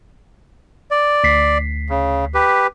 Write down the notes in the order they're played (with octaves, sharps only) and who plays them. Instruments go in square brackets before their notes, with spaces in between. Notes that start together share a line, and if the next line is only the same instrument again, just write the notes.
[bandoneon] D5
[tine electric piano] D2 B6 C7
[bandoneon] C#3
G4 B4